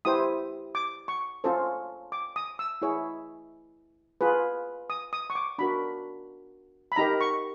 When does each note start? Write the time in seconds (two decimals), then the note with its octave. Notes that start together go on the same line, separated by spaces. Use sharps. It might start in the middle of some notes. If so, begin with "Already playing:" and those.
0.05 E4 G4 C5 D#6
0.75 D6
1.08 C#6
1.44 C#4 F4 A4 C5
2.12 D6
2.36 D#6
2.59 E6
2.82 E4 G#4 C#5
4.21 F4 G#4 B4
4.90 D#6
5.13 D#6
5.30 C#6
5.35 D6
5.58 D4 F#4 A#4 B5
6.92 B5
6.96 D#4 G4 A#4 A#5
7.21 C#6